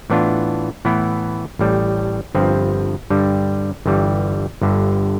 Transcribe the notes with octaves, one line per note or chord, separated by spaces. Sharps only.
A2 E3 B3 D4 F4
A2 E3 B3 E4
A1 A2 G3
G1 G2 F3 C4
G2 D3 G3
G1 G2 E3 G3
G1 G2 D3